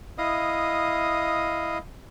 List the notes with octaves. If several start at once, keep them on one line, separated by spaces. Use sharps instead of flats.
E4 D#5 F5 D#6